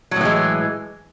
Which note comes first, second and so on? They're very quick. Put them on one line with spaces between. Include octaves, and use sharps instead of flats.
F#3 A2 E3 G#3